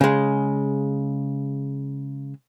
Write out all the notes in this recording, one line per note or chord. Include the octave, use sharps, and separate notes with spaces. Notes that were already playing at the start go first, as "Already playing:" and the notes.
C#3 G#3